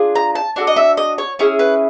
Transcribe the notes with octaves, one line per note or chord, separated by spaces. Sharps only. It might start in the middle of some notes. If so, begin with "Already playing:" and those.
Already playing: D4 F4 G#4
A#5
A5
D4 F#4 A4
D#5
E5
D#5
C#5
C#4 E4 G#4
B4